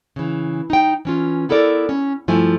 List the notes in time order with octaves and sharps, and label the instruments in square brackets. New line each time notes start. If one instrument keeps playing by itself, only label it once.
[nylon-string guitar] C#3 E3
D#4 G5
E3 C#4 F4
B3 E4 A4 A#4 D5
C#4
G2 F3 A3 E4 G#5